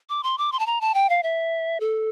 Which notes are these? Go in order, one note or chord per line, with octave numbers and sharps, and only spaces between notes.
D6
C6
D6
C6
A5
A#5
A5
G5
F5
E5
A4